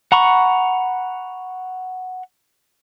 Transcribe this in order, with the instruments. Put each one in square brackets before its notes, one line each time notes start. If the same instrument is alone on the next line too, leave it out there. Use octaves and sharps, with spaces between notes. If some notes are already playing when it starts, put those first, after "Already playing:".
[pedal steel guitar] F#5 A#5 B5 C#6